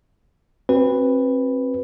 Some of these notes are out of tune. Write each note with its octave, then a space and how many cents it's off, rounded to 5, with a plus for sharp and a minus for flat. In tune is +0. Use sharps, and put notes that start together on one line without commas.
C4 +30 F#4 +0 B4 +0